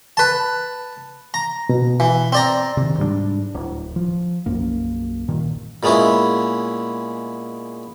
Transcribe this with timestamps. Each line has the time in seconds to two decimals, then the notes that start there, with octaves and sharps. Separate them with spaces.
0.17 B4 A5
1.34 A#5
1.69 B2
2.00 E3
2.32 C4 D5 A#5
2.77 C3 D#3
2.98 G#2 G3 A#3 D4
3.55 D1
3.96 F3
4.46 B1 F#2 A#3
5.28 G2 A#2 D#3
5.83 A#2 G#3 B3 C#4 E4